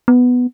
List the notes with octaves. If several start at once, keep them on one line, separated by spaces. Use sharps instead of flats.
B3